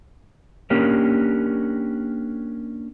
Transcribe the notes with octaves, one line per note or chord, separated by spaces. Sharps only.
A#3 C#4 D4 G4 A#4 C#5